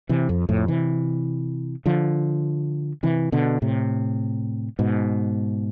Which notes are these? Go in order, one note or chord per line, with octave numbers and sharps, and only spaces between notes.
C3 E3
F2
F2 A2
C3 E3
D3 F3
C3 E3
B2 D3
A2 C3
G#2 B2